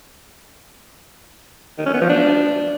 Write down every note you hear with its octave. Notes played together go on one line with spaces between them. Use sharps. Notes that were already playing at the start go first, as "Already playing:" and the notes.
D#3
C#4
B3
F3
D4